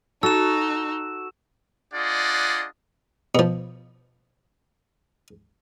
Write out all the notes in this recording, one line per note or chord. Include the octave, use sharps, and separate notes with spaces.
D#4 F#4 A4 E6 E7
D4 F4 G#4 D5 D#5 F#5
B2 F3